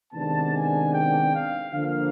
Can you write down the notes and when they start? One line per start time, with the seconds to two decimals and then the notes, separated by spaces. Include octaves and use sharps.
0.13 C3 D#3 G#3 B3 D4 A5
0.53 G#5
0.92 G5
1.33 F5
1.72 D3 F3 A#3 F5